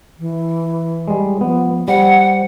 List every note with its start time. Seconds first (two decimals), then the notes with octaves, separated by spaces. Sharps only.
0.19 E3
1.08 G3 G#3
1.41 F3 B3
1.88 G3 C5 F#5